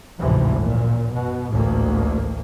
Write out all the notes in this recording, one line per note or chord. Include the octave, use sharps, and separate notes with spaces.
A1 D2 G#2 C3 E3 F3
F#2 A#2
B2
A1 D2 G#2 A#3